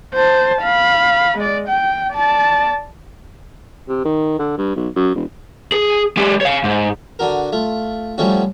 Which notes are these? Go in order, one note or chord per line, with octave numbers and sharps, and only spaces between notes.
C5 A5
F5 B5
G#3 D5
G5
D5 A5
C3
D#3
D3
G2
B1
F#2
E1
G#4
G#3 G4
C#5 F5
G#2
D3 D4 F#4 A#4
A3 F4
F3 G3 A3 C#4 F#4